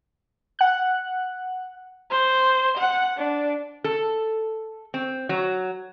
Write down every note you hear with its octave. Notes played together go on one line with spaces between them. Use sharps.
F#5 F#6
C5
F#5
D4
A4
C4
F#3